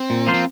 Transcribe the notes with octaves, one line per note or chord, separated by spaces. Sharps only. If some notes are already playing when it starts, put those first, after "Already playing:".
Already playing: C4
A#2
F3 A#3 F4 C5
C4